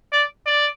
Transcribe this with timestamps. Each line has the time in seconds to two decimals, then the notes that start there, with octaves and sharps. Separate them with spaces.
0.13 D5
0.46 D5